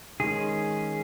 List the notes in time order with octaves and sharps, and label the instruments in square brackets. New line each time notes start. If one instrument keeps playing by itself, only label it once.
[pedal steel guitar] D#3 G#3 C#4 G#4